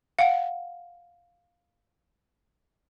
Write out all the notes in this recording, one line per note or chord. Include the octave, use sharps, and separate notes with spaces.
F5 F#5